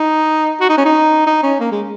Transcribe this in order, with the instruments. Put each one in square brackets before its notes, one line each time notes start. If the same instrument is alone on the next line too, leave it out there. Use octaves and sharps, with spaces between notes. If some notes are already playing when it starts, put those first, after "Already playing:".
Already playing: [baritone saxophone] D#4
F#4
D#4
C#4
D#4
D#4
C#4
A#3
G#3